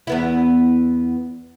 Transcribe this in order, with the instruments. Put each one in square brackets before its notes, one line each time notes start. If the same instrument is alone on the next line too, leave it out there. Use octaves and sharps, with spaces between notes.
[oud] E2 B3 E4